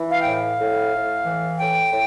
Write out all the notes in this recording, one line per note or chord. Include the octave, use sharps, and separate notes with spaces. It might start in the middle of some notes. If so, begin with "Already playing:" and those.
Already playing: E3
F5
G5
A2
F5
A2
A2
E3
A2 G5
A2